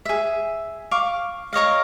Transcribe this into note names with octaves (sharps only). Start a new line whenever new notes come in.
G#4 E5
F5 C#6 D6
A#4 C#5 D#5 F5